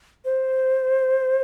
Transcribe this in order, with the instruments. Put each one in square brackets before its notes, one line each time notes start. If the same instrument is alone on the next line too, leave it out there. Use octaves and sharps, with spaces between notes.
[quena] C5